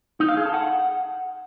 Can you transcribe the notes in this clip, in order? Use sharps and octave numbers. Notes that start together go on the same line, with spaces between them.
D#4
F5
G#4
A4
F#5